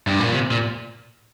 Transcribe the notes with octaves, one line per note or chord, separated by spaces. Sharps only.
G2
A#2
C3
A#2